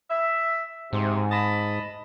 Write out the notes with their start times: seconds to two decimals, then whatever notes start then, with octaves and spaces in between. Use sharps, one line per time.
0.10 E5
0.93 G#2 C3
1.31 D#5 A5 B5